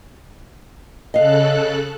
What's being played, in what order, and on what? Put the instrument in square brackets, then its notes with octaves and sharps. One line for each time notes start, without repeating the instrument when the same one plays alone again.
[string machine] C#3 A4 F#6 [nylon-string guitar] D#5 F5